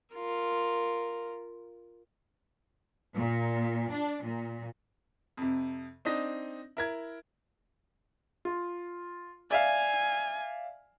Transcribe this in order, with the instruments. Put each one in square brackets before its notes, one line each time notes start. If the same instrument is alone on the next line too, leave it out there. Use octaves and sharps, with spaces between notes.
[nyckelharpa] F4 A#4
[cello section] A#2
D4
A#2
[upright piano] F2 C3
C4 D4 D#4 D#5
E4 A#4 G#6
[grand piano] F4
[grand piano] D5 E5 F5 [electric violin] G#5